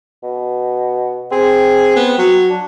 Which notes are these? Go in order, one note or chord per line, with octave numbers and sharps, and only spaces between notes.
B2
C4 G#4
B3
F#3
D4